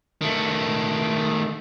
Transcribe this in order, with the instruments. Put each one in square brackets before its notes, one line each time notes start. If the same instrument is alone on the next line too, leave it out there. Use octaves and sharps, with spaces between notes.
[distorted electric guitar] D#3 A3